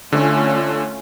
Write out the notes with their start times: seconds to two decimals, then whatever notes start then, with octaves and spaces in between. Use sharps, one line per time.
0.12 D3 A3 C#4 F4